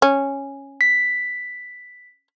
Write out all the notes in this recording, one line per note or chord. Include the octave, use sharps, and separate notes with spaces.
C#4
B6